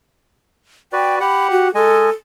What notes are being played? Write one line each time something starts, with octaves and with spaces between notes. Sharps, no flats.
F#4 B4 D5 G5
G4 F#5 B5
F#4
G#3 A4 D#5 G#5